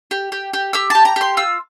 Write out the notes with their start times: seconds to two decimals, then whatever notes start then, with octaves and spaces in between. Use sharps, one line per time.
0.11 G4
0.32 G4
0.53 G4
0.73 G4 E6
0.90 G4 A5
1.05 A#5
1.16 G4 C6
1.37 F4 E6